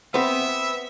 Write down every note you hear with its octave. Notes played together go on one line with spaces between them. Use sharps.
B3 C4 B4 E5